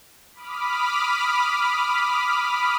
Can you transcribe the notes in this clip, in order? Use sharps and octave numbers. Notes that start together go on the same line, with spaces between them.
B5 D6 D#6 F6 B6